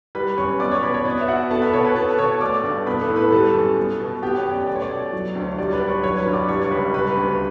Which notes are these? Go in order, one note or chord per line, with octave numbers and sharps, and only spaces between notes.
G3 B4 B5
F#2 C#5 C#6
B3 D5 D6
C#5 C#6
B2 B4 B5
C#5
B3 D5
E5
B2 F#4 F#5
B3 A4 A5
B4 B5
B2 C#5 C#6
B4 B5
B3 A4 A5
B2 C#5 C#6
A3 D5 D6
G2
B3 B4 B5
A4 A5
A2
B4 B5
G3 A4 A5
F#2
B3
B2
B3 G4 G5
C#5
F#2
D5
A3 D5
C#5
D5
B2
F#3
D2
C#5
G3 D5
B4 B5
D2
C#5 C#6
F#3 C#5 C#6
B4 B5
G2
D5 D6
G3 C#5 C#6
C#6
C#2 B4 B5
G3 B4 B5
D2